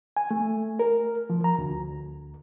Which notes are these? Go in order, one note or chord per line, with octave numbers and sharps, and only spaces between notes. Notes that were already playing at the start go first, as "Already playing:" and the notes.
G#5
A3
A#4
F3
A#5
D2